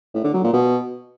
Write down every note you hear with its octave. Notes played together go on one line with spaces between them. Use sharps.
A2
D3
F#3
A#2
B2